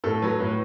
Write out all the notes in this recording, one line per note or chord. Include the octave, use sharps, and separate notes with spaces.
A2 A4
F#3 B4
A2 B4